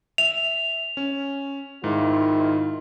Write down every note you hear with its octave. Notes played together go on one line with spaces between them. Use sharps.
E5 F7
C#4
G#2 D#3 E4 F4